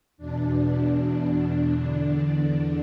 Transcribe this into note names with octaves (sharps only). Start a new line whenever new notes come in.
E2 B2 D4
D4
E2 D3